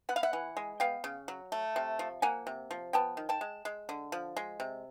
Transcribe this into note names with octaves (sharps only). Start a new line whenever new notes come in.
B3 F#5
F5
E5 F#5
E3
G#3
B3 F5 G5
C#3
F#3
A3
C3
F3
A#3 F#5 G#5
C3
F3
B3 G5 A5
D#3
G5 A5
G#3
G#3
D3
F3
G#3
C3